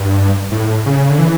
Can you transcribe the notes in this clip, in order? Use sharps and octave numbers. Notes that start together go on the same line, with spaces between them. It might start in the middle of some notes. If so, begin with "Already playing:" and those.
Already playing: G2
A2
C#3
D3
E3